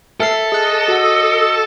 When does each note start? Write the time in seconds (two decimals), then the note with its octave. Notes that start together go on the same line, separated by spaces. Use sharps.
0.20 A4 E5 F6 C7
0.52 G#4 D#5 F#6
0.88 F#4 F#5